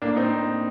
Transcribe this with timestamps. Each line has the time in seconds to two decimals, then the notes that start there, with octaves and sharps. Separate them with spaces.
0.02 A2 A#3 D4
0.16 C4 D#4